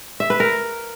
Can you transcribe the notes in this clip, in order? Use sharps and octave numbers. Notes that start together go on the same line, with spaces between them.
E5
B4
A#4